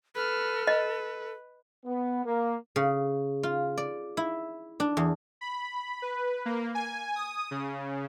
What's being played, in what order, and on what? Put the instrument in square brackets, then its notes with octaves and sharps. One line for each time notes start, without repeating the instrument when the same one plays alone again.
[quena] A4 [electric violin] B4 F6
[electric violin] B4 [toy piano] D#5
[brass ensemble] B3
A#3
[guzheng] C#3
F4
D5
E4
D4
E2
[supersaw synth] B5
B4
A#3
G#5
D#6
C#3